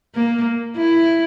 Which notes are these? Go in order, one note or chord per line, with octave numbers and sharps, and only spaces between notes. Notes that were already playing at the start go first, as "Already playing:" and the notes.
A#3
E4